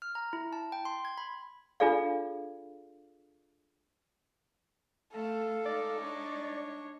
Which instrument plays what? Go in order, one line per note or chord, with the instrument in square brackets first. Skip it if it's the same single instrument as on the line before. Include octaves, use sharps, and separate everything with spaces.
[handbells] F6
A#5
E4
A5
G5
C6
G#6
B5
[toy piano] D4 F4 G#4 A4 D5 F5
[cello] A3 [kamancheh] A4 F5
[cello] G#3 D#4 [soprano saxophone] D5
[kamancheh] D4 C#5